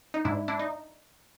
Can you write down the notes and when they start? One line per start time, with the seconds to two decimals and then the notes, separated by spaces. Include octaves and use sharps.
0.14 D#4
0.25 G#2 D4 E4
0.48 D4 E4
0.60 D#4